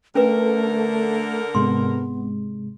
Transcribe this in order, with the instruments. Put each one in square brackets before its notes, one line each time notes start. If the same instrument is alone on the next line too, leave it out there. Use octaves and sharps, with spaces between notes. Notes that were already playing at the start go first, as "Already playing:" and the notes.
[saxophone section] D3 A#4 [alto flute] A3 [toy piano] C#4 B4
[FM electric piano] G#2 C3 G#3 [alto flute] B3 [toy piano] C6